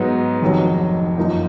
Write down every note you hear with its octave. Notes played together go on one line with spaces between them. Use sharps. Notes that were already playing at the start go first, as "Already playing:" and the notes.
Already playing: G#2 F#3 B3 D#4
F1 F2 D#3 F#3
F#2 F3 A#3 D#4